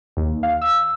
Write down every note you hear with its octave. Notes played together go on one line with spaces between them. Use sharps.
D#2
F5
E6